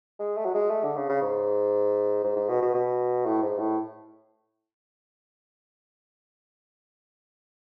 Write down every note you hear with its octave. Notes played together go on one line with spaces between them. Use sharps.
G#3
A3
F#3
G#3
A3
D3
C#3
C#3
G#2
G#2
G#2
B2
B2
B2
A2
G#2
A2